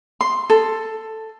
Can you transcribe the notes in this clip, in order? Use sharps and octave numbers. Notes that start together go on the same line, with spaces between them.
C6
A4